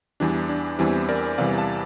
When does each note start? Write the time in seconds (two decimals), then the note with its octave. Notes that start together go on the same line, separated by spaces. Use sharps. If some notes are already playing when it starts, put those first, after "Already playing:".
0.20 E2 E3 G3 D4
0.49 D4
0.79 E2 E3 G3 C4 E4
1.09 A#4 D5
1.38 E2 C3 E3 G3 D5 F5
1.58 F5 A5